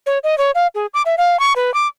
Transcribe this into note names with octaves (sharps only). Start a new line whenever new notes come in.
C#5
D#5
C#5
F5
G#4
D6
E5
F5
C#6
B4
D6